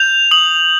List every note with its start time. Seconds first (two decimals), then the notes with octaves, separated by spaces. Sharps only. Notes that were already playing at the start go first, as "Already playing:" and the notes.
Already playing: G6 F7
0.31 D#6 F#7